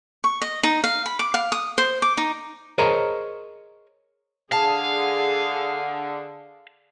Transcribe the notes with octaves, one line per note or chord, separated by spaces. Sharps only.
C#6
D#5
D#4
F5
B5
D6
F5
D#6
C5
D6
D#4
G#4 A#4 C5 C#5 D#5 A#5
D3 G#4 F5 A5